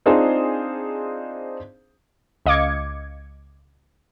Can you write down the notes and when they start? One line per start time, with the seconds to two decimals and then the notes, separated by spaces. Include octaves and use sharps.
0.06 C4 D4 D#4 F4 G#4 C5
2.46 C#2 D#5 F5 D6 G#6 C#7